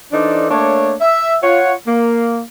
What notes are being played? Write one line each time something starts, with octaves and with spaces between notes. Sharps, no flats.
E3 D4 D#4 A4 C5 D5
A3 A#3 D4 C#5
E5
F4 C#5 F#5
A#3